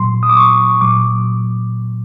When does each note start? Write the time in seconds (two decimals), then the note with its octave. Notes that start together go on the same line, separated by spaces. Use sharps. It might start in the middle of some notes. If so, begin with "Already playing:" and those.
Already playing: A#2 F#3 C6
0.23 D#6
0.30 D6
0.37 C#6
0.81 A#2 F#3 D6